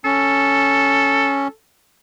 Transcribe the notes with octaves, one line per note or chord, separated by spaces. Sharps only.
C#4 A4